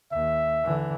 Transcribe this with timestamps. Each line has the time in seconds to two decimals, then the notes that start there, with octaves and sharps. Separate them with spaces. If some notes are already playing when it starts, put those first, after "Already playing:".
0.12 D#2 E5
0.64 D3 E3